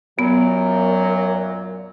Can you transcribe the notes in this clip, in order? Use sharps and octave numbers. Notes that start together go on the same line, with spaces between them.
F#2 A#2 F#3 B3